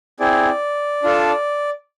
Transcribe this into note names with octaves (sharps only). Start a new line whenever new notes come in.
C4 E4 G#4 D5
D4 F4 A4